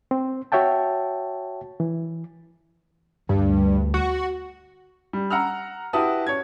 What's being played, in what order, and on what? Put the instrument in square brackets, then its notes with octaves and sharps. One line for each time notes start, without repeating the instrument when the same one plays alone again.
[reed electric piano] C4
F#4 C#5 E5 G5 A5
E3
[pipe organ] D2 [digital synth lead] G2
[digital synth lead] F#4
[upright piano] G3
F#5 A#5 E6 F6
E4 F#4 G4 B4 A5 D#6
C#5 G#6